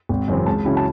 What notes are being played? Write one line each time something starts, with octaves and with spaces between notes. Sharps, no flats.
G#1
F#2 C#3 E3 C4
C#2 A5
C#3 F#3 C#4 E4
A5